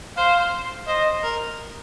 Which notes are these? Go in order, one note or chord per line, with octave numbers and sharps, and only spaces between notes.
C5 F5
C5 D#5
A#4